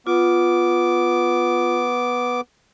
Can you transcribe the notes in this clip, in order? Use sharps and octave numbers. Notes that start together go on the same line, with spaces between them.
B3 F4 D6